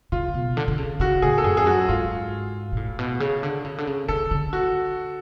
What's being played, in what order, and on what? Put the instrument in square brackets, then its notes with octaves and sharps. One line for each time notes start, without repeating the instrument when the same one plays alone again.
[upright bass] C#3 [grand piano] F4
[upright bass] B2
D3
D3
C#3
[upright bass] C#3 [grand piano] F#4
[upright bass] A2 [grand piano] G#4
[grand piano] A4
[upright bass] F#2 [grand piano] G#4
[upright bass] F2 [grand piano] G#4
[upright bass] F#2 [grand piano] F#4
[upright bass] G#2 [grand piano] F4
[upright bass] B2
A2
B2
C#3
D3
C#3
D3
C#3
[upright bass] C#3 [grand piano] A4
[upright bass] D3
[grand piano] F#4